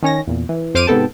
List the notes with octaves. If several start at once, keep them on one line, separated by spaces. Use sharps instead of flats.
D#3 C#4 C#5 A#6
E2 A#2
E3
F2 C5 D6 F6 D7 D#7
G#2 C3 B3 A4 G5 A5